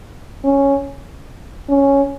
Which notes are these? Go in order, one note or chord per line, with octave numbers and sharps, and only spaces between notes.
C#4
C#4